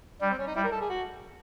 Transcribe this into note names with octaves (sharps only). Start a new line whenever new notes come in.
G3 D4
C4
C#4
D#4
G3 E4
A#4
A4
G#4
F#4